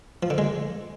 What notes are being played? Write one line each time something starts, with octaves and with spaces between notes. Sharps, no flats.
F3
D3
G#3